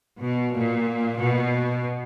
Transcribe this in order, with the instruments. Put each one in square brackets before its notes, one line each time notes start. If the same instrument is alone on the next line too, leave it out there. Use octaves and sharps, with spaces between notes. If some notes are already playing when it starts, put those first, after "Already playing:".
[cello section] B2
A#2
B2